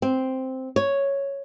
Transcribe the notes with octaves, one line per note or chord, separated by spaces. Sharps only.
C4
C#5